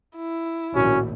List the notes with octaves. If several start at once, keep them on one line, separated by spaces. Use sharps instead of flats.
E4
A#1 D#2 A2 C#4 F#4